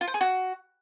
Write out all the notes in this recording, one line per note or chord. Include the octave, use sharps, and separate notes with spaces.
F4
C5
G#4
F#4